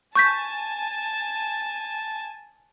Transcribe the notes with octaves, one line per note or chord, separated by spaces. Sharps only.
G#5 A5 C#6 G6 B6